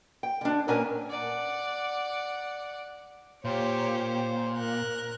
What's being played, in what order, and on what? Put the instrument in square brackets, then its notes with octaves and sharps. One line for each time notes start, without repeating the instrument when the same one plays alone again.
[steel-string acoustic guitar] G5
D3 D4
A#2 A#3 C#4 A#4 B4 G#5
[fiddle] D5 F#5
[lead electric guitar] A#2 [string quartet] G4 C#5 [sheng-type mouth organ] C5
[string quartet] A#4 F#6